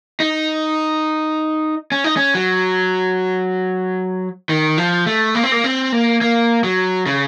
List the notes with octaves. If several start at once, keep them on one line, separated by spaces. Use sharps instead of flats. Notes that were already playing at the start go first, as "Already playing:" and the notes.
D#4
C#4
D#4
C#4
F#3
D#3
F3
A3
A#3
C4
A#3
C4
A#3
A#3
F#3
C#3